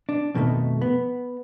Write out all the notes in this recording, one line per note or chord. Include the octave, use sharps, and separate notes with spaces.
D4
F2 B2 D#3 G#3 A3
B3